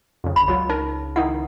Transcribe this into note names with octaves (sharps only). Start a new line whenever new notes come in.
F2 C#3
G1 B5
C#2 F#3 F4 C#5
D#4 A#4
D#3 D#4 E4 F#5